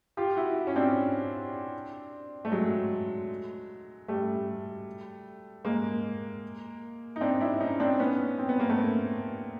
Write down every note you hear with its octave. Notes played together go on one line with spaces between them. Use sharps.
F4 G4
E4 F#4
C#4
C4 D4
A3
F#3 G#3
G3 A3
G#3 A#3
D#4
C4 D4
D4 E4
C#4 D#4
C4 D4
B3 C#4
C4
B3
A#3
A3 B3